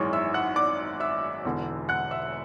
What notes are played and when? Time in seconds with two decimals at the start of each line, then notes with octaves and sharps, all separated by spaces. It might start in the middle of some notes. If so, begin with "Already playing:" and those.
Already playing: G#1 F#2 E3 G#3 C#5 C#6
0.13 E5 E6
0.34 F#5 F#6
0.56 D5 D6
1.00 E5 E6
1.45 E1 E2 D3
1.89 F#5 F#6
2.11 E5 E6